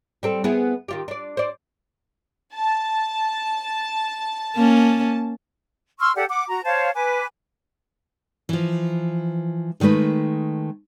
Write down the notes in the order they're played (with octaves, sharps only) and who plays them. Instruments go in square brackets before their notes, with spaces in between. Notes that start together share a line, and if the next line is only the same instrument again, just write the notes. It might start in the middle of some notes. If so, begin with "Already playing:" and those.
[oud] G3 C4 A4
B3 E4 G#4
D#3 F4 G4
D4 D5
C5 D5
[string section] A5
[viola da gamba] A#3 C#4
[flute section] C6 C#6 E6 F6
G4 A4 D5 F#5
F#5 D6
F#4 A#5
C5 C#5 F5 A5
B4 G#5 D6
[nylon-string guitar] E3 F3
D3 D#3 G#3 A3 B4